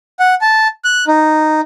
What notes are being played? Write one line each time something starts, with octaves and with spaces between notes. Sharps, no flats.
F#5
A5
F#6
D#4